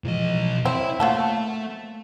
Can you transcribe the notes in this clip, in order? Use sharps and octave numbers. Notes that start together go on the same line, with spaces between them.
B1 E3 F3 G#3 D#5
C4 E4 C5 C#5
A3 A#3 F4 F#4 A4